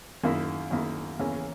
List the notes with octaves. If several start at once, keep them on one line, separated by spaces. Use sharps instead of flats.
F#2 D#3 A#3 E4
F#2 D#3 A#3 E4
E2 C#3 E3 A#3 C#4